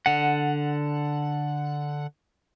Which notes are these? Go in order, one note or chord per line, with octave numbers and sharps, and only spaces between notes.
D3 F#5